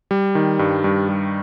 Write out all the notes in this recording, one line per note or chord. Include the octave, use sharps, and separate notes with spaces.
G3
D#3
G2
G2
G3